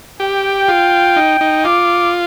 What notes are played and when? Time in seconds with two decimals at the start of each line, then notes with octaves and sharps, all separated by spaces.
0.19 G4 G5
0.68 F4
1.16 D#4
1.41 D#4
1.65 F4 D6